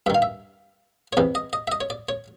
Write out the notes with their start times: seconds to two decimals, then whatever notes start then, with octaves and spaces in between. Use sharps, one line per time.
0.06 G2 E5
0.10 D#3 F5
0.22 E5
1.13 C#5
1.17 E2 C3 E3 D5
1.35 D#5
1.53 D#5
1.68 E5
1.72 D#5
1.81 C#5
1.90 D5
2.09 C#5